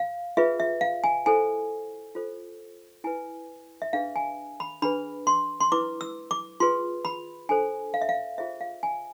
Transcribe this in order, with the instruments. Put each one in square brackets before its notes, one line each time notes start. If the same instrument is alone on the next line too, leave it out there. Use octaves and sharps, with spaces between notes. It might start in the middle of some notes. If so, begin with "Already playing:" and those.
Already playing: [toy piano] F5
F4 G#4 B4 E5
E5
F5
G#5
E4 A4 C5 G#5
F4 A4 C5
E4 B4 G#5
E5
D4 G#4 B4 F5
G#5
B5
D4 G#4 B4 B5
C6
C6
E4 B4 D6
E6
D6
F4 G#4 B4 C6
B5
D4 A4 C5 G#5
F5
E5
F5
F4 G#4 C5 E5
F5
G#5